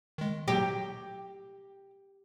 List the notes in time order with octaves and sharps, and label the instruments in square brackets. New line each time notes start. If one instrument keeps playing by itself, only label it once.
[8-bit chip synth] D#3 G#3
[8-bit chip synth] B2 F#3 A#6 [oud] G4